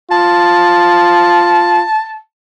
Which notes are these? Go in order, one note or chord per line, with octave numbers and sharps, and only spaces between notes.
F4 A5